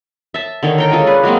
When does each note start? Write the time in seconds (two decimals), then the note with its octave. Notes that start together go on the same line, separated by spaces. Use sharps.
0.34 E5 A5
0.63 D3 D#3 A4 C#5
0.78 A#4 G5 A#5
0.91 G#3 C#4 F4 A4
1.06 D4 G#4 B4
1.23 F#3 G#3 A#3 C4